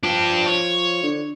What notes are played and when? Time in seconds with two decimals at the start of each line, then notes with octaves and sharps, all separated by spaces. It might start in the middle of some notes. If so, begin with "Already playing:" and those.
0.03 F3 D4 G4
0.47 C#5
1.03 D3